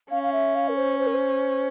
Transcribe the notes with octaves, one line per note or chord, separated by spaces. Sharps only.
C#4 F5
F5
E5
F5
A#4
C5
C5
A#4
C5